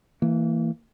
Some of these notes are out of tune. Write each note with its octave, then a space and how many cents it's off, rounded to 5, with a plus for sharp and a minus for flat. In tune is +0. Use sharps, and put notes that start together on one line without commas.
E3 +0 A#3 -30